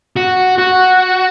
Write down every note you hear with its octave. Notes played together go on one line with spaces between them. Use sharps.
F#4
F#4